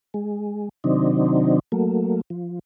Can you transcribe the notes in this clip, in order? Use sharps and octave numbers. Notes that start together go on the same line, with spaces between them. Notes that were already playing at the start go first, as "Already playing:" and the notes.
G#3
C3 D#3 F#3 C4 D4 D#4
F#3 A3 A#3
F3